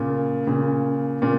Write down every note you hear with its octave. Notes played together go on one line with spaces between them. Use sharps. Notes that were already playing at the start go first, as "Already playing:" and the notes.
Already playing: A#2 C#3
A#2 C#3
A#2 C#3